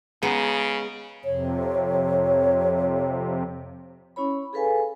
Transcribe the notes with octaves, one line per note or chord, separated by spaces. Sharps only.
C#3 G#3 B3 D#4
F2 C3 C#5
C#4 E4 C#5 B5
G#4 A4 B4 F5 G#5